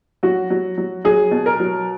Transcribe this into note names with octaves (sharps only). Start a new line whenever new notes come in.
F#3 F#4
F#3
F#3
F#3 G#4
B2
A#4
F#3